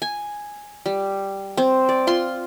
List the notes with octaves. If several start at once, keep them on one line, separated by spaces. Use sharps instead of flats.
G#5
G3
C4
D5
F4 C6